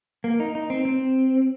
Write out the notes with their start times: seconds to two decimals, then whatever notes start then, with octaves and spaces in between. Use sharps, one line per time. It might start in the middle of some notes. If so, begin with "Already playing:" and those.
0.24 A#3
0.40 D#4
0.55 D#4
0.70 C4
0.85 C4